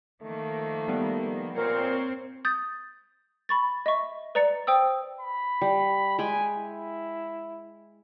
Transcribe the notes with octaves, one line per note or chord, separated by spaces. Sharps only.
D#3 F3 A3 A#3
G3 B3
A#2 C4 A#4 C5 C#5
D#6 G6 A6
B5 C#6 A6
D#5 E5 C#6
B4 D5 A#5 A6 C#7
C5 G5 D#6 E6
B5
G3
G#3 G5 G#5 B5
E4